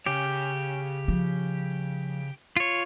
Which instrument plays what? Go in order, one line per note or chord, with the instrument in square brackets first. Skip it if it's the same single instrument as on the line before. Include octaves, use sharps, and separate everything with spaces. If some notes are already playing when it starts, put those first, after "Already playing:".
[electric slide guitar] C#3 C#5 [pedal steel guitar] G4
[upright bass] F3
[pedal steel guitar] F4 C#5